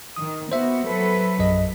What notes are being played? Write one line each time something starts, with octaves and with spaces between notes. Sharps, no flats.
D#3 D#6
B3 F#4 C5 E5
F#3 A4 B4
A#1 F#2 D#5